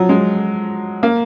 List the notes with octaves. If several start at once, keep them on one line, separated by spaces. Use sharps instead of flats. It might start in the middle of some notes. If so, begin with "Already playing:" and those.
Already playing: F3 F#3
G#3
A#3